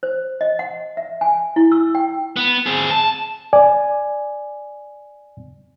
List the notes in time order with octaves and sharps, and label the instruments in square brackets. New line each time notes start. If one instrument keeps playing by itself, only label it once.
[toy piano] C5
D#5
F#5
E5
G#5
E4
E6
G5
[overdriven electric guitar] B3
C4 G#4
A5
[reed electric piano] D5 G#5